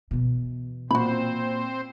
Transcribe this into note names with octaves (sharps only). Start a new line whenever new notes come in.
B2 E3
A#2 C4 F#4 C5 B5